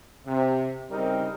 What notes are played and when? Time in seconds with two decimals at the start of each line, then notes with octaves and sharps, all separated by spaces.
0.25 C3
0.90 C2 C#3 G3 C4 D#4 A#4